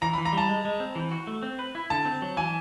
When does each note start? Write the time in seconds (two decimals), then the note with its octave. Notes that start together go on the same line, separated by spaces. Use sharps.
0.02 E3 A#5
0.13 B5
0.18 E3
0.25 A#5
0.33 G3
0.38 A5
0.49 G#3
0.65 G#3
0.80 C4
0.95 E3
1.11 F#4
1.27 A3
1.43 C4
1.59 B4
1.75 E4
1.90 D3 A5
2.05 C4
2.22 F#3
2.37 E3 G#5